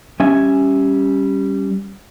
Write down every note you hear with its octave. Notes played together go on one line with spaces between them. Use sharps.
G3 C#4 E5 G#5